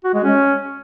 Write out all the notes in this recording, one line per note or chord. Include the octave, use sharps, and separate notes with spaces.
F#4
G#3
C#4